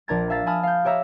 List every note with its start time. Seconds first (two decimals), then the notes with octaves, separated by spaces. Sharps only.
0.08 A#1 D4 A#4 A#5 G#6 A6
0.30 E5 F5 A#5 A6
0.46 G#5 A5 B5 D#6 F6
0.63 F5 G6
0.85 G4 C#5 E5 A#5